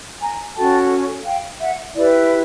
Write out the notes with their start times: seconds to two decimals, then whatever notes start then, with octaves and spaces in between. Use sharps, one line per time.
0.21 G#5 A#5
0.56 C#4 F#4 A4 G5 A5
1.25 F5 G5
1.60 E5 F#5
1.95 E4 G4 B4 D5